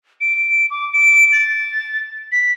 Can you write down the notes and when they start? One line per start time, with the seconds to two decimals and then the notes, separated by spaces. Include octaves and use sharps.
0.21 D7
0.70 D6
0.93 D7
1.32 A6
2.32 B6